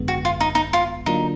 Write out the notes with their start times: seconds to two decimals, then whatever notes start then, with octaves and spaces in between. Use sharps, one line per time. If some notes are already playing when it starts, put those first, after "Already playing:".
Already playing: G#1 F#2 D3 G#3 B3
0.08 F#4
0.25 F4
0.40 D#4
0.55 D#4
0.73 F4
1.06 D3 F#3 A#3 D4 D#4 F4